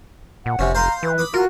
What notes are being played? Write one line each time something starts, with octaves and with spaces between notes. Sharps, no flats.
A#2 F#5
F1 C3 C#4
C5 F5 A#5 C6
E3 B4
B5 D6 D#6
F4 F#4 A#4